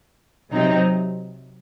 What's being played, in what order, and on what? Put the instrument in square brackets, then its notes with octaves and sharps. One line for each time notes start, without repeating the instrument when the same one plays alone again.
[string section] C3 F#3 C4 D#4